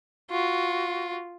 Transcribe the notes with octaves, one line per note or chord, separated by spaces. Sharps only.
F4 F#4